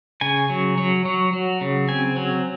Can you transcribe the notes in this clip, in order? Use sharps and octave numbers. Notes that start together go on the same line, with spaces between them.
C#3 G#5
F#3
F#3
F#3
F#3
C#3
C4 G#5
F#3